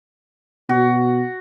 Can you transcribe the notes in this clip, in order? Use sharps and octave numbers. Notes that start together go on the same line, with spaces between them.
B2 F#4